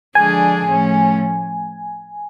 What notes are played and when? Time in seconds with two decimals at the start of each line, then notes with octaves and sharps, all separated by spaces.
0.15 D3 F3 G#3 D4 G#4 G#5
0.67 A2 F3 A3 C#4